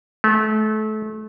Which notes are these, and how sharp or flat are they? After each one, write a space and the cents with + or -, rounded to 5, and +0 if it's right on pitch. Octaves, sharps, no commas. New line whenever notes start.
A3 -30